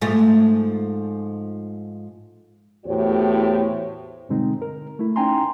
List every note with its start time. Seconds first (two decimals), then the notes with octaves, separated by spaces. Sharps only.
0.01 G#2 F3 A3
2.86 E2 A2 F#4 G4 C5 C#5
4.29 G2 B2 D3 G#3 C4 D#4
4.62 A#4
4.99 A3 E4
5.16 C#4 D#4 G5 G#5 A#5 C6